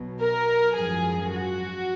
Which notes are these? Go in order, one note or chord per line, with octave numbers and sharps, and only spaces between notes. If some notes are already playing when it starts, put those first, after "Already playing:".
Already playing: B1 B2 F#3
A#4
G#1 F#2 F3 G#4
F#4